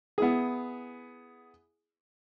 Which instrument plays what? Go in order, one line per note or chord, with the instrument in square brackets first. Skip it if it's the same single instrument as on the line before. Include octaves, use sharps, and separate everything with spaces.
[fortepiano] B3 E4 G#4